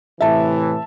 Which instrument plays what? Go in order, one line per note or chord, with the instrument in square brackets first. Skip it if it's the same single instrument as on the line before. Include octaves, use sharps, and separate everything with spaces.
[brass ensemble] A2 C3 E3 [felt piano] E5 A5